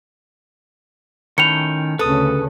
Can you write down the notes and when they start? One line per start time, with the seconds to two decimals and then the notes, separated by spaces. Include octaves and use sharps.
1.38 A2 D#3 C#4 G5 C#7 F7
1.99 D2 C#3 C#4 A4 B4 D#6